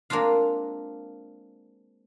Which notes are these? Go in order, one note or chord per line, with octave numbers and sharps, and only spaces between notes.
G#3 A#3 C4 D4 F4 F5